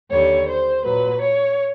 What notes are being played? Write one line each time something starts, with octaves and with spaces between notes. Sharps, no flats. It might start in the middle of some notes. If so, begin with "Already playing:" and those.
D#2 D3 G3 C#5
C5
A#2 F#3 B4
C#5